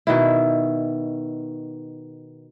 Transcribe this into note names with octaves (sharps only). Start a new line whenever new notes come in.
B2 D#3 E4